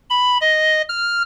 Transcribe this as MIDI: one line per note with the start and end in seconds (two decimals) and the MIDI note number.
0.10 0.38 83
0.41 0.82 75
0.89 1.22 89